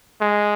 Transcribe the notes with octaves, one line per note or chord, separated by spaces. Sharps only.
G#3